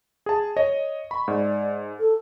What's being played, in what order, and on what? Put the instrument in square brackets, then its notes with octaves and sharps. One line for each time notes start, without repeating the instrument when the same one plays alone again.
[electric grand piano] G#4 A5
C#5 D#5 A#6
[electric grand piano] B5 [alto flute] C#6
[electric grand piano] G#2 [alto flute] D5
[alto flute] A4